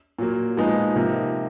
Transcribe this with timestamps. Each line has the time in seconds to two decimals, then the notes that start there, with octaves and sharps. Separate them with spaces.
0.19 A#2 F#3 A#3
0.57 A#2 F3 G#3 B3 D#4
0.96 C3 F3 A#3 D#4